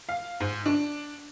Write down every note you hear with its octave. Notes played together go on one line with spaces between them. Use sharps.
F5
G#2
D4